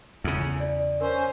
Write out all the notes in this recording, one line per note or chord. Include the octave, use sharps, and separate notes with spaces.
E2 C#3
D5
C#4 A#4 C5 C6